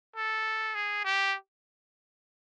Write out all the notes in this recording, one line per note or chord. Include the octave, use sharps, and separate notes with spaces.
A4
G#4
G4